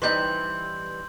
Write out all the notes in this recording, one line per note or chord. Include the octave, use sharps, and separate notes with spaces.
E3 G3 D#4 C6 G6 F#7